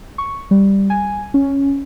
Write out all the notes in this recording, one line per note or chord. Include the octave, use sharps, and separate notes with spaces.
C#6
G3
G#5
C#4